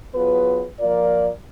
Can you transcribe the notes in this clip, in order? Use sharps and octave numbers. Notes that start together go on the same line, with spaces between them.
F#3 B3 F4 G#4 B4
F3 A#3 F4 A#4 D5